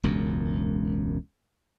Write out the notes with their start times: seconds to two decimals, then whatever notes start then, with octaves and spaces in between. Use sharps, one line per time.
0.03 E1 C#2 F#2